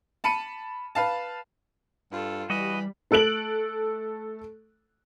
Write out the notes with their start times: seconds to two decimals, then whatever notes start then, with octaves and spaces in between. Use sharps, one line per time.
0.24 A5 B5 C#7 D#7
0.95 B4 F5 A5
2.12 G2 F4 A4
2.50 E3 G3 F#4 D#5 B5
3.11 A3 A4 F#6 D7 F#7